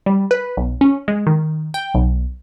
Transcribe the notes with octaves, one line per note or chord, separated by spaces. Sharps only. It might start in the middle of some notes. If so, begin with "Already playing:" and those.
G3
B4
B1
C#4
G#3
D#3
G5
B1